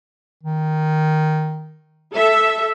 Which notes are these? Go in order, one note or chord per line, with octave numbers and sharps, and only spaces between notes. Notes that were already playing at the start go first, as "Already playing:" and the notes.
D#3
A4 E5